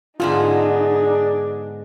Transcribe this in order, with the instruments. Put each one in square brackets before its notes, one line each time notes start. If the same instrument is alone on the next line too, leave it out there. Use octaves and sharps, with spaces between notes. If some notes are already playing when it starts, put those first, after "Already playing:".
[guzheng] G#2 D3 B3 [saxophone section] D4 G#4 [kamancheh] D#4 [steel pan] F4